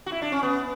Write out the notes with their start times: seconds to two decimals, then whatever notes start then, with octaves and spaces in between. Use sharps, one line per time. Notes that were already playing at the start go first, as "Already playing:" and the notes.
0.06 F#4
0.12 E4
0.22 D4
0.32 C#4
0.43 B3